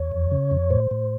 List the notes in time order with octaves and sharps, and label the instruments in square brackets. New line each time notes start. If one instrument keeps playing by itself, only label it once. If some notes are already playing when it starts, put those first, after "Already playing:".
Already playing: [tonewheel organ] E2 C#5
F2
C#3
F2
A2 C5
A2